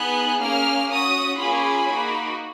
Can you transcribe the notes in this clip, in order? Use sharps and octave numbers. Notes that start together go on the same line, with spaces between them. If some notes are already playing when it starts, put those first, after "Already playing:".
Already playing: B3 D#4 G#4 F#6
A#3 C#4 G#4 F6
C#4 F#4 D#6
A#3 C#4 F4 G#4 B5
A#3 D#4 F#4